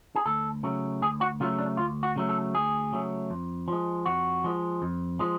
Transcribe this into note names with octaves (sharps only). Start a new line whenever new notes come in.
G#4
D2 A4
C#3 F#3 A3
D2 G#4
F#4
C#3 F#3 A3 F4
D4
D2 F4
F#4
C#3 F#3 A3
A4
D2 G#4
C#3 F#3 A3
F2
F3 G#3
F2 F#4
F3 G#3
F2
F3 G#3